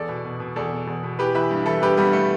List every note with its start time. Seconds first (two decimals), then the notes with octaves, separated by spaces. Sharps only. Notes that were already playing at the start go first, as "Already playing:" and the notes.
Already playing: E2 A4 D5
0.09 B2
0.25 B2
0.40 B2
0.56 E2 A4 D5
0.72 B2
0.87 E2
1.03 B2
1.19 E3 G4 B4
1.35 E3 B4 E5
1.51 G2
1.66 E3 E4 A4
1.82 G2 G4 B4
1.97 G2 G3 B3
2.13 A3